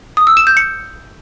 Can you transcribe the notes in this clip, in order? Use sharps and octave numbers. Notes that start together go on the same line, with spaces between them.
D#6
E6
E7
G6
C#7